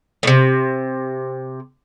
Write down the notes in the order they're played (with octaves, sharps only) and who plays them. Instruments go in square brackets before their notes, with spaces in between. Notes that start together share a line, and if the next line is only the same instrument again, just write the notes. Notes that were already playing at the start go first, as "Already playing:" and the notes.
[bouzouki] A2 C3